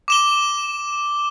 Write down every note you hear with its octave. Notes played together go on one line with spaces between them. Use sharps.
D6 E7 G7